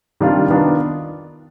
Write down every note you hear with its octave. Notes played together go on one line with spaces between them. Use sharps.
C3 D#3 G3 D4 F4
D#3 B3 D4 F4